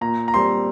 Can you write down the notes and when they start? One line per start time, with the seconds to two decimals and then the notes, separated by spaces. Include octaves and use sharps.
0.01 A#2 A#5
0.28 A#5
0.34 G3 C4 C6